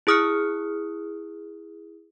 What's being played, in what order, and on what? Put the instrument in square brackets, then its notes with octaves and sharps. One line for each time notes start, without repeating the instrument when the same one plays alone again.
[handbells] E4 G#4 D#6 F6 F#6 C#7